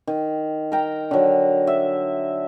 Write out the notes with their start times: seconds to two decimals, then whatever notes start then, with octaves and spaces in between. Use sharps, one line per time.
0.07 D#3
0.72 A#4 G5 A#5
1.11 D3 F#3
1.67 E5